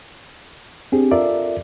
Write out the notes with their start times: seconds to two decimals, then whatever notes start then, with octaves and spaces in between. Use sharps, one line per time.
0.92 C4 D4 G4 G#4
1.11 F4 A4 A#4 D5 E5